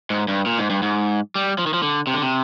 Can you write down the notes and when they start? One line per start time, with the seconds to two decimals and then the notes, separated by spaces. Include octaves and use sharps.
0.10 G#2
0.28 G2
0.46 A#2
0.59 G#2
0.70 G2
0.82 G#2
1.35 G3
1.59 F3
1.66 D#3
1.74 F3
1.83 D3
2.07 C3
2.14 D3
2.22 C3